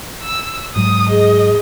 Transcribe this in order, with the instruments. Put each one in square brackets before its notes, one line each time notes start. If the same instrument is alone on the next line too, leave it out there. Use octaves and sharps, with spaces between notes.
[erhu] E6
[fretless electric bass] G#2 F#3 [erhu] D#6
[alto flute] G#4 [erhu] D#5